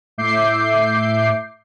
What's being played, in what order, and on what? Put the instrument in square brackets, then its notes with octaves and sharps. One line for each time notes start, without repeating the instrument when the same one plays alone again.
[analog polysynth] A2 E5 D6 G6 C7